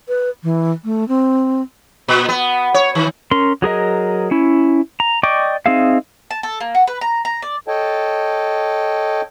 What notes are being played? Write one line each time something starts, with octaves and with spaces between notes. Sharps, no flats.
B4
E3
A3
C4
A#2
B3
C#5
D#3
C#4 A#4 C6
F#3 G#4 A#4 D#5
C#4 E4
A#5
D5 D#5 G5 C#6 D6
C4 D#4 G#4 E5 F5
A5
A4
A#3
F#4
B4
A#5
A#5
D5
A4 C#5 D#5 G5 A5